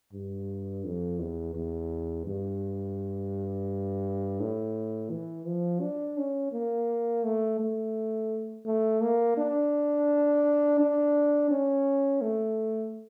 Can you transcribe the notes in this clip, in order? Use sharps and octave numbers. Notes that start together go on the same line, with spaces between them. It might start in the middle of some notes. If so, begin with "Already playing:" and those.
G2
F2
E2
E2
G2
A2
E3
F3
D4
C#4
A#3
A3
A3
A3
A#3
D4
D4
C#4
A3